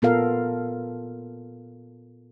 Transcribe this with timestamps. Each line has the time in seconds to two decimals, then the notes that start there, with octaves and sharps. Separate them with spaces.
0.02 A#2 B3 F4 A4 A#4 F5